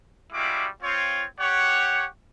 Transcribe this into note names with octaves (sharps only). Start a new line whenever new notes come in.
G3 G#3 E4 F#4 F5 D6
C4 F4 C#5
G4 C#5 F#5